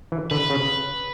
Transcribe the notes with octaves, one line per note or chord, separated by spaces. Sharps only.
E3
D3 B4
C#3